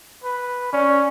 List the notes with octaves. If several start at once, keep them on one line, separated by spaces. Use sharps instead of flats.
B4
C#4 D5